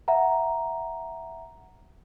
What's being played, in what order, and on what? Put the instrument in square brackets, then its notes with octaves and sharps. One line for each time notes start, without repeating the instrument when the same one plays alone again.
[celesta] E5 F#5 A#5